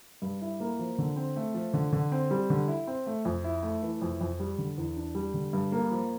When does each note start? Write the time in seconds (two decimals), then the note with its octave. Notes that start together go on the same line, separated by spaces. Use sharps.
0.22 G2
0.41 E4
0.60 A#3
0.79 F3
0.98 D3
1.16 C4
1.36 A3
1.54 F3
1.74 D3
1.92 D3
2.12 C4
2.31 G3
2.50 D3
2.68 E4
2.87 C4
3.07 A3
3.25 F2
3.44 E4
3.63 A3
3.83 E3
4.02 F2
4.21 F2
4.40 G3
4.58 D3
4.78 E2
4.96 D4
5.15 G3
5.34 D3
5.53 G2
5.72 A#3
5.91 F3